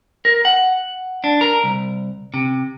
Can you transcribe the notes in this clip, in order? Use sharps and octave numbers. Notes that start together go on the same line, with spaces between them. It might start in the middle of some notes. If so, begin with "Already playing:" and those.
A#4
F#5
D4
A#4
C2
C3